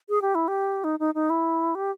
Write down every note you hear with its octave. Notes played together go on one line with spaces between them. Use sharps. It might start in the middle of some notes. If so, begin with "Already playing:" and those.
G#4
G4
E4
G4
D#4
D#4
D#4
E4
G4